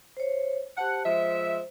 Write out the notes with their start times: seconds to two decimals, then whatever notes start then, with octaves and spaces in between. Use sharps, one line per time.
0.17 C5 C#5
0.78 G4 C5 F#5 A5
1.05 F3 G#3 C5 E5